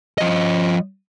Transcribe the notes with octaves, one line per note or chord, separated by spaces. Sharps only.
F3 D#5